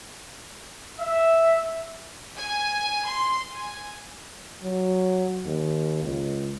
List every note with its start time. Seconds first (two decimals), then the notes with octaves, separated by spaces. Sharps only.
0.99 E5
2.37 G#5
3.07 C6
3.52 G#5
4.63 F#3
5.45 D#2
6.03 C#2